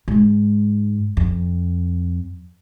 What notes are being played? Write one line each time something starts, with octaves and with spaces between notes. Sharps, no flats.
G#2
F2